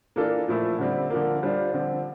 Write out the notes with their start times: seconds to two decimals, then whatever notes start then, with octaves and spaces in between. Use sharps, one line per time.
0.16 E3 A#3 D4 F4 A4
0.48 A#2 F3 A3 E4 A4
0.79 D3 G3 C4
1.10 D3 F3 A#3
1.43 G3 D4 F4 C5
1.73 D3 F3 C4